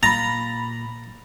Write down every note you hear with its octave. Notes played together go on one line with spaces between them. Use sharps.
A#2 A#5 B5 A6